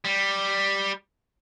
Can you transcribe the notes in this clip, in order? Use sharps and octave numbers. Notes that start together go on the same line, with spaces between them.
G3